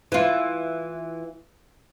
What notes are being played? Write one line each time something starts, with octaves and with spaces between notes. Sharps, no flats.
E3 F4